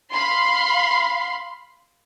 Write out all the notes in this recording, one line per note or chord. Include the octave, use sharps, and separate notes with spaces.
F5 B5 C6